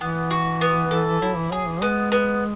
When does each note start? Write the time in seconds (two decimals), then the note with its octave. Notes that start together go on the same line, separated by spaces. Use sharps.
0.01 E3 B3
0.31 F#4
0.61 B3
0.91 A4
1.21 F#3 E4
1.37 E3
1.51 F#3 G#4
1.67 E3
1.82 G#3 B3
2.12 B3